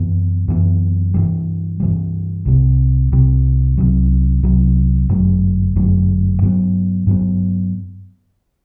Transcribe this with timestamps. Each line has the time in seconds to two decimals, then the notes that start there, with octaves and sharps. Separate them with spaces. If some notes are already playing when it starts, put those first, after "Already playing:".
Already playing: F#2 E3 B3
0.48 F#2 E3 B3
1.14 G2 E3 G3
1.80 G2 E3 G3
2.46 C2 C3 G3
3.12 C2 C3 G3
3.78 C2 C3 F#3
4.43 C2 C3 F#3
5.09 G1 F#2 F#3 A3
5.76 G1 F#2 F#3 A3
6.42 G2 F#3 B3
7.07 G2 F#3 B3